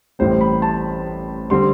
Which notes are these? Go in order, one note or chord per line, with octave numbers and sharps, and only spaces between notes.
A1 A2 G3 C4 C5
B5
A5
D3 G3 C4 C6